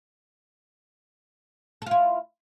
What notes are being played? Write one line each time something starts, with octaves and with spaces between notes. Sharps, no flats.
E4 F4 A4